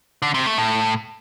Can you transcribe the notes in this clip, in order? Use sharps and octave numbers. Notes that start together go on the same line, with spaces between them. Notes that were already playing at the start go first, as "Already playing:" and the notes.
D3
C3
A3
A2